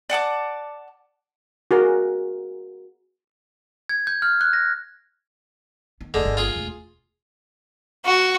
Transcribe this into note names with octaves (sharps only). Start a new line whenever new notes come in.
D5 F#5 A5 D6
F#4 G#4 A#4
G#6
G6
F6
F#6
A#6
D#3 B3
F1 C2 D3 G#3
G1 A#3
F4 G#4
E1 D2
F#4